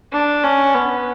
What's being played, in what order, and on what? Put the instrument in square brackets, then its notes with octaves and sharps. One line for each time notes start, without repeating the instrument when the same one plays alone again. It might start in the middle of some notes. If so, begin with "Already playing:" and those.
[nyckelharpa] D4
C#4
B3